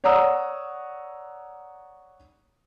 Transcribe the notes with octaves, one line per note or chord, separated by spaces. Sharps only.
C#5 D5 F#5 A#5 D#6 E6